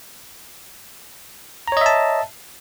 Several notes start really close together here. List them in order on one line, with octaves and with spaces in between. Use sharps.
A#5 C#5 D#5 E5 A5